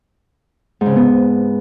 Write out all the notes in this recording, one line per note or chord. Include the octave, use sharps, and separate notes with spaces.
G#2
C#3
C3
B3